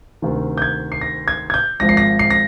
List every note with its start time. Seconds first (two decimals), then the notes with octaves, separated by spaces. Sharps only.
0.22 D2 C3 D#3
0.58 G6
0.62 G#6
0.92 C7
1.01 A#6
1.28 G#6
1.50 G#6
1.54 G6
1.80 G#1 G#2 F3 A#6
1.89 C7
1.97 A#6
2.19 C7
2.31 A#6